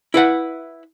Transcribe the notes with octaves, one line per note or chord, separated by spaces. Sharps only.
E4 B4 F#5